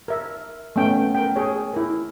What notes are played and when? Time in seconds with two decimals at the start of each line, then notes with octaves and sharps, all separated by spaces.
0.08 A#4 E5
0.76 A3 B3 C#4 G5
1.15 A#4 G5
1.36 G#4 C#5
1.74 E4 A#4